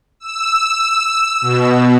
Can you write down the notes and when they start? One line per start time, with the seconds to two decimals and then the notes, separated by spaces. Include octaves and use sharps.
0.20 E6
1.41 B2